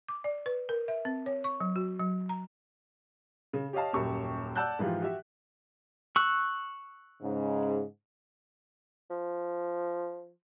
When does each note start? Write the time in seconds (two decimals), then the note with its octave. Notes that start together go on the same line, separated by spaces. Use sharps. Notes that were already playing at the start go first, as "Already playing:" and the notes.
0.09 D6
0.24 D5
0.46 B4
0.69 A#4
0.88 E5
1.05 C4
1.26 C#5
1.44 C#6
1.60 F#3
1.76 F#4
2.00 F#3
2.29 A#5
3.53 C#3
3.73 G4 C#5 D#5 F5 A5
3.93 D#1 F#2 G4 C#6
4.55 D5 F#5 A5 E6 F#6 G6
4.79 G#2 E3 F3 F4 G4
5.02 F#4 G4 E5
6.16 C#6 E6 F#6
7.22 G#2 C#3
9.10 F3